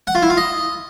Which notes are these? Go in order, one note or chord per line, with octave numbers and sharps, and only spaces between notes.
F#5
F4
E4
F4
D#5